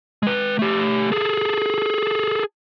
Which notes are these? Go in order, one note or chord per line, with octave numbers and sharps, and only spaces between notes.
G#3 B4
A3 G4
G#4 A4